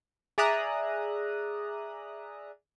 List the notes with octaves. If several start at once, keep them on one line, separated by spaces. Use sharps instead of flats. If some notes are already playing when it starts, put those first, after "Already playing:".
G#4 D5 E5 A#5 D#6 F#6